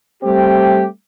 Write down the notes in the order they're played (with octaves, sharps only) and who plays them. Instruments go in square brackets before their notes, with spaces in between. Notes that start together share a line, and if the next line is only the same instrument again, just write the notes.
[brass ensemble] G3 A3 C4 G4